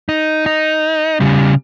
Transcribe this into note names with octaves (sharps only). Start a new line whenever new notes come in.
D#4
D#4
C#3 G3